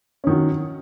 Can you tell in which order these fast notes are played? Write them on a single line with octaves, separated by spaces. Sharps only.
C#4 D#3 F#3